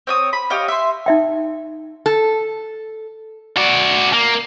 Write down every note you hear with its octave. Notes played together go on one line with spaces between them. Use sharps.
C4 C#5 D#6
B5
G4 C#5 D#5 F5
E5 C6
D#4 E5 G5
A4
F#4 D5
A#3